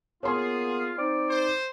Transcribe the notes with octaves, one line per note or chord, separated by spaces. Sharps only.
A#3 B3 F4 G#4 C#5 C6
C4 D#4 D5
C5